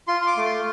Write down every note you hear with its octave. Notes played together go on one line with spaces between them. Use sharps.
F4 C6
C6
D6
A3
C6